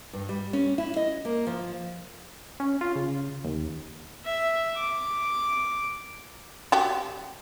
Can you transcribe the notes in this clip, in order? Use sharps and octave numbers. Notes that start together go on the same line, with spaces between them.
G2
G3
C#4
E4
D#5
A#3
F3
C#4
F4
C#3
D#2
E5
D6
F#4 G4